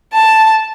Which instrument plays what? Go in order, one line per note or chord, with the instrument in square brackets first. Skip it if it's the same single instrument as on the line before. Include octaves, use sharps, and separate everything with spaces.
[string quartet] A5